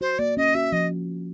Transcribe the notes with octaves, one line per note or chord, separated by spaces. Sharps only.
F#4 C5
A#3 D5
C#4 D#5
F#4 E5
F3 D#5